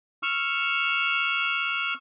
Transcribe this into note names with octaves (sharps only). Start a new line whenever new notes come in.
C#6 E6 F6